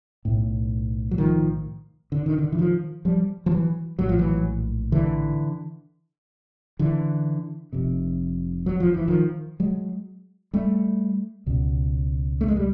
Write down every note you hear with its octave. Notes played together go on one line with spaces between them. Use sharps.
B1 A2
F#3
D#3 F3
D3
D#3
D3
E3
D#3 F3
F3 G3
F3
E3 F#3
A#1 A2 F#3
F3
E3 F#3
D3 E3
D3 E3
F1 F2 C3
F#3
F3
E3
D#3 F3
F#3 G#3
G3 A3
C#2 B2
A3
G#3
G3